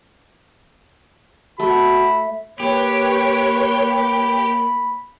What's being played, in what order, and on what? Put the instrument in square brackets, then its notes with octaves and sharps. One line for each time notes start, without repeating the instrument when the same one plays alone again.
[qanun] A3 [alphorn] F#4 [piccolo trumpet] B5
[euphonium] A#3 [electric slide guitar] G4 [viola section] B4 C#5 [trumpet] B5